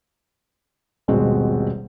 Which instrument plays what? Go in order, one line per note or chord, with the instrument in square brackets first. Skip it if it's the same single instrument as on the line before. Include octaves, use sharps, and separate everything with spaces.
[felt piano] D#1 G#1 B2 G#3 C4 F#4